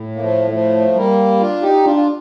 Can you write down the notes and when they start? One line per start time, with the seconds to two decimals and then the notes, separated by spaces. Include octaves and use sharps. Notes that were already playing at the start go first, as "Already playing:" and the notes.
Already playing: A2
0.16 A#3
0.20 F3 A3
0.51 F3 A3
0.95 G3 A#3
1.40 D4 F4
1.62 D#4 G4
1.84 D4 F4
1.96 F4